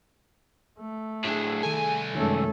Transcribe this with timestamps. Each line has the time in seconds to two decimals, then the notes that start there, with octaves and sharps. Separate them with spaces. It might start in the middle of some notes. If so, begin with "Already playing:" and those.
0.79 A3
1.25 A2 D4 G#4
1.63 C2 D#3 A4 G#5
2.15 F#2 D#3 G#3 A3 C#4 A4